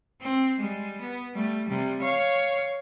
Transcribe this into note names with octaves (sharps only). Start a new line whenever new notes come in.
C4
G3 G#3
B3
G3 A3
C3 G3
C#5 F5